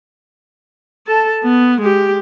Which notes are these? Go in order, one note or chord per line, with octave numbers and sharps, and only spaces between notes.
A4 A5
B3
G#3 G4